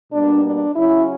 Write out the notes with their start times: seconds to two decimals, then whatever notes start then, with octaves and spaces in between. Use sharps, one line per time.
0.13 B2 G3 A#3 D4
0.44 D4
0.76 C#3 F#3 C#4 E4